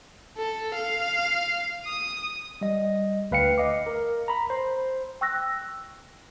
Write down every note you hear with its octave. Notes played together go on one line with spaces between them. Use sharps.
A4
F5
D#6
G3 D#5
D2 B4 F5 G5 C#7
D#5 F5 D6
A#4
A#5 B5
C5
G5 C#6 E6 F#6 A#6